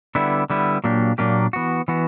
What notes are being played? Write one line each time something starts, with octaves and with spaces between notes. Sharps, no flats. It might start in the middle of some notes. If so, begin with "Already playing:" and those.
D3 G3 B3 E4
D3 G3 B3 E4
A#2 F#3 A#3 D4 G4
A#2 F#3 A#3 D4 G4
E3 B3 F#4
E3 B3 F#4